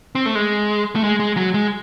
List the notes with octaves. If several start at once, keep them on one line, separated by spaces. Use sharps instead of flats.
C4
A3
G#3
A3
G#3
G#3
F#3
G#3